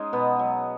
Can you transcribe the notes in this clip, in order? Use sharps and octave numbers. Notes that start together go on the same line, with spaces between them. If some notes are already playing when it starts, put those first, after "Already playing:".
Already playing: G#3 C#4 D#4 C#5 D#5
B2 B3 B4
F#3